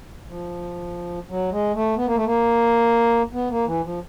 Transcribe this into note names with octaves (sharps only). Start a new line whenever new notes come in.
F3
F#3
G#3
A3
B3
A#3
A3
A#3
B3
A#3
E3
F3